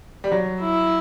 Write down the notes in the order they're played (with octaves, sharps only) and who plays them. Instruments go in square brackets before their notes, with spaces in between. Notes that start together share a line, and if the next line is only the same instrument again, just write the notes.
[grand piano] G3
F#3
[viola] E4